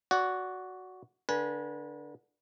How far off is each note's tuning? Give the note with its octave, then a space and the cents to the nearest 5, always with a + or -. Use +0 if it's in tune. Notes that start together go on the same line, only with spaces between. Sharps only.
F#4 +0 D5 -25 F#5 +0
D3 +0 B4 -35 G#5 +0